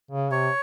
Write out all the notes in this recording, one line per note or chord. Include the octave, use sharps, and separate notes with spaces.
C#3
C3 C#5